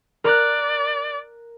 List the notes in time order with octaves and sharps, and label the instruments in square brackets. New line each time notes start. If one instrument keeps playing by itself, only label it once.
[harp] A#4 F#6 [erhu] D5